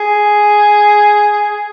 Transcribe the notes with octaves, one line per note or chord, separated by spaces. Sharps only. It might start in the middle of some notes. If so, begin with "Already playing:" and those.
Already playing: G#4